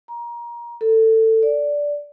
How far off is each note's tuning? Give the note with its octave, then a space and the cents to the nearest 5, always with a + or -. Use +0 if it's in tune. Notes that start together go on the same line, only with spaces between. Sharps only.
A#5 +25
A4 +20
D5 -10